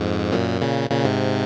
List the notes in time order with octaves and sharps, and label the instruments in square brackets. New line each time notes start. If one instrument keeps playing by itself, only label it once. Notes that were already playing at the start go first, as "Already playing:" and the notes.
Already playing: [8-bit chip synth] F2 G#2
F#2 A#2
A#2 C#3
A#2 C#3
G#2 C3